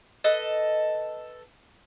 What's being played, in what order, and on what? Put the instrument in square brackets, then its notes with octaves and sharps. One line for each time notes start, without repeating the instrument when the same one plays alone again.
[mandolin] A4 B4 D#5